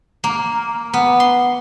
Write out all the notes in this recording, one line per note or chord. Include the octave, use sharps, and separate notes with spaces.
A#3
B3
C6